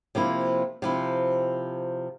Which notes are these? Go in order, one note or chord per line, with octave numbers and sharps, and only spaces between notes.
C3 F3 A#3 E4
C3 F3 E4